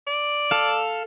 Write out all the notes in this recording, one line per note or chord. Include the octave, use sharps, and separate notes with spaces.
D5
A4 F5